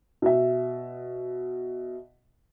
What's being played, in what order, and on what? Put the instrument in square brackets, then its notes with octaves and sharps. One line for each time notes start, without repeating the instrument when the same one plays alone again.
[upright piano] B2 E5